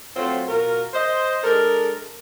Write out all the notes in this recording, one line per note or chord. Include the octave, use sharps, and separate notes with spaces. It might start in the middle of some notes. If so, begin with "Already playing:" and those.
F#3 A3 C4 F4 C5 C#5
B2 F4 F#4 A#4
C5 D#5
G#3 D4 A4 A#4